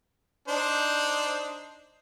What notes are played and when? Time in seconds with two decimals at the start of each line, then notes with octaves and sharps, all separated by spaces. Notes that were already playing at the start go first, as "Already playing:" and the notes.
0.48 D4 D#4 C5